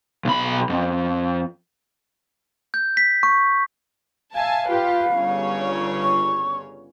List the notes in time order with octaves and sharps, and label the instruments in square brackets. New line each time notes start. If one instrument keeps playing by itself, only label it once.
[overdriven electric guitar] B1 B5
F2
[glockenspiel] G6
B6
C#6
[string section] E5 G#5 A5 [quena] F5
[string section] F4 G4 B4
G1 C#3 C#5
[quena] C#6